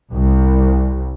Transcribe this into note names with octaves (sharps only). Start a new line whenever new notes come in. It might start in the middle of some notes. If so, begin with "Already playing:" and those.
C2